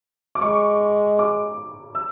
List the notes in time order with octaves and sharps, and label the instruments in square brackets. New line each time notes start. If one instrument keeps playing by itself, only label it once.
[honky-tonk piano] D6
[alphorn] G#3 [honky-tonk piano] C#6
[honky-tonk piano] D6
E6